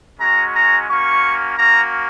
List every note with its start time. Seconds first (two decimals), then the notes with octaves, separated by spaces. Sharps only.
0.20 G#3 C#4 F#4 A#5
0.55 A#5
0.88 A#3 C#4 F#4 C#6
1.58 A#3 C#4 F#4 A#5